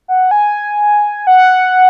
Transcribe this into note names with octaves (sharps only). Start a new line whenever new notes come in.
F#5
G#5
F#5